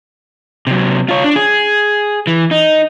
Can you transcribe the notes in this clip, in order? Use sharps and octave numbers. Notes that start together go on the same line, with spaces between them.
C3 F#3
F4 C#5
D4
G#4
E3
D#4